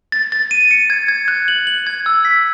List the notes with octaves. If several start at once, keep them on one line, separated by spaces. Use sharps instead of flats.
A6
A6
D#7
C#7
G#6
G#6
F#6
F#7
F#7
G#6
E6
B6